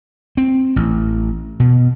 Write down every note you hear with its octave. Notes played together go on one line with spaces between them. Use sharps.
C4
A1
B2